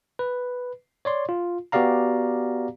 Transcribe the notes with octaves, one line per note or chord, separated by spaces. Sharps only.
B4
C#5 D5 C6
F4
B3 F#4 G4 D5 F5 A#5